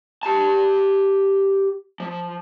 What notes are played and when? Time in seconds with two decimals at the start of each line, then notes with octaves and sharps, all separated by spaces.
0.23 G4 A5
2.00 F3